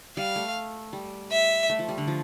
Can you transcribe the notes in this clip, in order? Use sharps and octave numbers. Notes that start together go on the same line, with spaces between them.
G3 F5
A3
G3
E5
A3
F3
G3
D3
F3